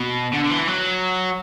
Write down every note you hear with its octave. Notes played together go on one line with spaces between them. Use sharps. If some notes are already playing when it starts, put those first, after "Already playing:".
Already playing: B2
D3
D3
E3
F#3